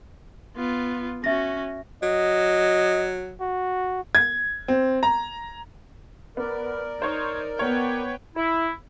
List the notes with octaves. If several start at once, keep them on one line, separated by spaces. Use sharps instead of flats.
B3 F4
C#4 F#4 E5 A#6
F#3 D#5
F#4
G#6
C4
A#5
B3 A#4 D5
D#4 C5 C#5 C#6
B3 B4 C#5 F#5 G5
E4